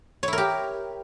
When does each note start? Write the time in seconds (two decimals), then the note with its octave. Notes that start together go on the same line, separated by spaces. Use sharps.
0.23 C#5
0.28 E4
0.33 A#4
0.38 G4